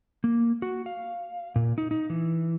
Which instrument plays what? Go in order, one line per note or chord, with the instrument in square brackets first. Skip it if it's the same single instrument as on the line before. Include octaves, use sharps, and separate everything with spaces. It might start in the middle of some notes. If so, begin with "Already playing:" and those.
[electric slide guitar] A#3
F#4
F5
A#2
D#4
D#4
E3